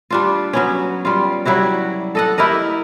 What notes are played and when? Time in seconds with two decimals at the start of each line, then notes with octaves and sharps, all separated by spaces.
0.10 G3 D4 F4
0.53 F#3 B3 C#4
1.05 G3 F4
1.45 F#3 G3 E4 F#4
2.15 A4 D#5 F#5
2.38 E4 G4 A#4 D#5